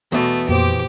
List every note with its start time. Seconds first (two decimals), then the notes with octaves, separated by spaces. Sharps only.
0.12 E2 B2 A3
0.49 F2 A#2 A#3 G4 C5 D6